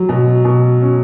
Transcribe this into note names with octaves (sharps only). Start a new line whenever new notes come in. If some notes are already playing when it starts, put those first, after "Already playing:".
Already playing: F#3
B2
B2
C#4